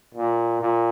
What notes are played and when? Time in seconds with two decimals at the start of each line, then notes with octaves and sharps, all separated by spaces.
0.14 A#2
0.61 A#2